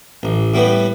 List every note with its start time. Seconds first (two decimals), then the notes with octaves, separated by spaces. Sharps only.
0.23 A1
0.54 A2 G3 B3